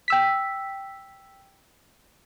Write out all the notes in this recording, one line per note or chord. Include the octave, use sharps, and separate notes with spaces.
G5 E6 B6